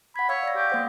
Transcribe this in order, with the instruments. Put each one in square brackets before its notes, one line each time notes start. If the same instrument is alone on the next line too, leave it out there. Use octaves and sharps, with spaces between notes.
[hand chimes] F#5 G#6 [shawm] B5
[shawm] C#5 [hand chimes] F5 E6 G#6
[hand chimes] D5 F5 A#6
[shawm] G4
[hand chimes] A#3 C5 F#5